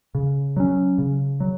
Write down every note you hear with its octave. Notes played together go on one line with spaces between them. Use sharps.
C#3
F#3 C#4
C#3
F#3